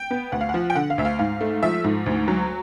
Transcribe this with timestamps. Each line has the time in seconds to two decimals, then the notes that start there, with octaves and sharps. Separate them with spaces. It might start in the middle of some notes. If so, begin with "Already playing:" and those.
Already playing: G5
0.11 B3
0.32 D2 F#5
0.41 F5
0.49 F3 F#5
0.70 G5
0.75 D3 F#5
0.90 F5
0.98 D2 E5
1.05 F5
1.19 G#2 F5
1.41 A3
1.63 F3 E5
1.84 G#2
2.06 D2
2.28 F#3